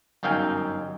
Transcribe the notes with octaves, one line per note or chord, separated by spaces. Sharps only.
G1 F#2 D#4 F5 G5 G#5